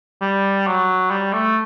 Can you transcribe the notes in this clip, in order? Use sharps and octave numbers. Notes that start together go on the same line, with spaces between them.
G3
F#3
G3
A3